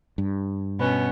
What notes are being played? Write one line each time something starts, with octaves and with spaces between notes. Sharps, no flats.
G2
B2 B3 C#4